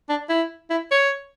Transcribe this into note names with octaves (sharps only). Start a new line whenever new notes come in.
D4
E4
E4
C#5